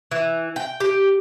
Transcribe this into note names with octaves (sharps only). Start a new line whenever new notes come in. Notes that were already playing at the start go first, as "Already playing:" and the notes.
E3
G5
G4